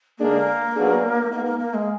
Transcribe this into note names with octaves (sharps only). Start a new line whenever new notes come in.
D3 G#3 A#3 D4 G#4
F#3 B3 D4 G#4
G#3 A#3 B3 D#4
A#3
A#3
G#3